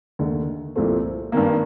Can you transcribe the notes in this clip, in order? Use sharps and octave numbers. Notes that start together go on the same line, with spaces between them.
D#2 D3 A3
C2 A#2 F3 A3 C4
G2 D#3 A#3